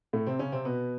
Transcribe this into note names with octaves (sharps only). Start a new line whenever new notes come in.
A2 A3
C3 C4
C#3 C#4
C3 C4
B2 B3